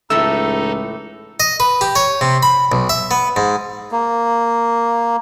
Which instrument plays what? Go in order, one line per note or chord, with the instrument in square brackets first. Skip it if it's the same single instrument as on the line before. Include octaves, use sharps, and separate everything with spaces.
[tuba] C#2 [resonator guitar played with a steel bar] A2 E3 A3 [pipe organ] D#4 A4 [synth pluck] E6
[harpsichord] D#5
B4
G4
C#5
C3
B5
B1
E5
B3
G#2
[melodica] A#3